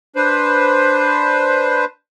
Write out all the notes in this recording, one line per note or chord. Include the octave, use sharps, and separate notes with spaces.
D4 B4 C5